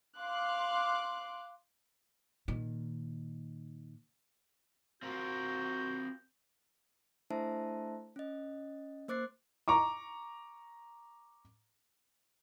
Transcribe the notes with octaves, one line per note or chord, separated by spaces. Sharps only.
F5 C6 D6 F#6
A#2 D#3
C4 F4 F#4 A#4 G6
A3 D4 E4 C5 E5 A5
C#4 D#5
A#3 C5 D6 F#6 A6 C7
A#5 C#6 D6